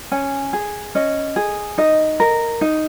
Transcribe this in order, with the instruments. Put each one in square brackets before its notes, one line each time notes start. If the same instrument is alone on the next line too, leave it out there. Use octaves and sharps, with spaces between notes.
[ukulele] C#4 G#5
G#4
C#4 D#5
G#4
D#4 D#5
A#4
D#4